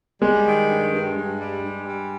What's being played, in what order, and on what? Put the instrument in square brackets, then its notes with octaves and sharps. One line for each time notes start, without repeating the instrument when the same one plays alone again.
[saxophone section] G3 [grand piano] G#3
[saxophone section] D#3
G2
G2
G2
G3
G2
G3